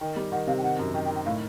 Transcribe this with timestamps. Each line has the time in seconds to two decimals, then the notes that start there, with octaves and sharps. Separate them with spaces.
0.01 D#3 G5
0.16 G3
0.32 D#3 F#5
0.47 C3 F5
0.58 G5
0.63 D#3 F#5
0.79 F#2
0.94 D#3 G5
1.05 G5
1.11 D#3
1.16 G5
1.26 A2 F5